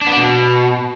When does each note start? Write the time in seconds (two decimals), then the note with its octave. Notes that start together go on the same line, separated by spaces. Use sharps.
0.01 D4
0.07 B3
0.12 D4
0.17 B2